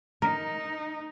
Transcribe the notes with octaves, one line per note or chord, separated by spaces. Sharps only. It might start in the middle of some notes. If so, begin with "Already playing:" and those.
D#4 A#4